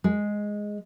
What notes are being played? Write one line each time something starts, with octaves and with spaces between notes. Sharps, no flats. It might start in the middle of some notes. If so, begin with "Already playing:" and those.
G#3